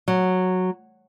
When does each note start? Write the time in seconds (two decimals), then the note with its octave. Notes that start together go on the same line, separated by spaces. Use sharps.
0.08 F#3